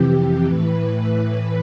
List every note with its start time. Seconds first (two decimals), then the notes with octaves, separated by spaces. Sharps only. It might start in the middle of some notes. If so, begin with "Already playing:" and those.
Already playing: F2 C3 E3 G4
0.46 A2 E3 B4